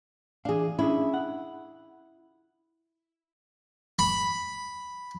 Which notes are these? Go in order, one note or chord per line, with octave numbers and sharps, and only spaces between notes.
E3 D4 G#4 F5
C#4 D4 E4 G#4
F#5
B5